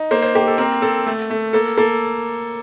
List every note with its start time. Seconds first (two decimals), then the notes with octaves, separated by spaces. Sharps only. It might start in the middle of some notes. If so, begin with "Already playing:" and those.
Already playing: D#4
0.11 A#3 C5
0.22 C5
0.35 A#3 G4
0.47 A4
0.58 C4 A#4
0.82 C4 A4
1.06 A3
1.30 A3
1.53 A#3 A4
1.78 A#3 A4